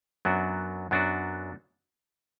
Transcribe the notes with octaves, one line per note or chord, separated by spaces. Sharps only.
F#2 F#3 B3 D4 F#4
F#2 F#3 B3 D4 F#4